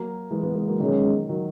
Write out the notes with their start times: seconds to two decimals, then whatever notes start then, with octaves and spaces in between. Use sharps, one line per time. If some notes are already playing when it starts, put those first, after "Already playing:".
Already playing: F#3 A#3
0.31 E3 G#3
0.43 G#3 B3
0.55 G#3 B3
0.67 F#3 A#3
0.80 B2 D#3 F#3 G#3 C#4
1.29 D#3 F#3